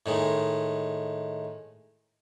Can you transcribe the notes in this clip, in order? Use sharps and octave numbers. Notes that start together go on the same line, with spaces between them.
A2 D#3 G#3